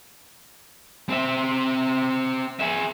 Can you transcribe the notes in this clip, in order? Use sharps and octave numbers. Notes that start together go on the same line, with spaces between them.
C4 E5
G#4 E5